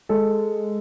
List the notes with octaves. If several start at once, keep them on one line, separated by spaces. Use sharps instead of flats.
G#3 A4